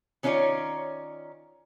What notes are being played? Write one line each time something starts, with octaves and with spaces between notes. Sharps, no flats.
D#3 C#4 D#4 F4 C#5 D5